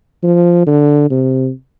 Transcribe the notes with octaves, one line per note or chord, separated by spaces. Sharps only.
F3
D3
C3